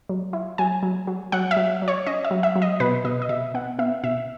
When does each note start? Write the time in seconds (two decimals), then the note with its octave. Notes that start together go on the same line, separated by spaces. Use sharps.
0.09 F#3
0.33 E4
0.58 F#3 G#5
0.83 F#3
1.07 F#3
1.32 F#3 F#5
1.51 E5
1.57 F#3
1.82 F#3
1.88 C#5
2.06 C#4 D#5
2.25 E5
2.31 F#3
2.43 E5
2.56 F#3
2.62 D#5
2.80 B2 B4
3.05 B2 D#5
3.22 D#5
3.29 B2 E5
3.54 B3 F#5
3.79 B3 E5
4.04 B2 E5